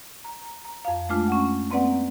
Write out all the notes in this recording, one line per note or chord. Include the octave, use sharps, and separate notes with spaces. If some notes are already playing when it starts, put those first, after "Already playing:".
A#5
A#5
F2 F5
G#3 A3 D4 F4
C#4 F#5
A#3 C4 B4 D5 F#5